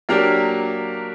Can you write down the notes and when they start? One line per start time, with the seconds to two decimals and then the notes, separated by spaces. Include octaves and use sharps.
0.09 F#3 A#3 D4 G4 A#4